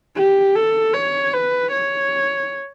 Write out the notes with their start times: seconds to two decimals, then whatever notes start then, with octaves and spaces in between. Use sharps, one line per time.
0.16 G4
0.55 A4
0.93 C#5
1.33 B4
1.72 C#5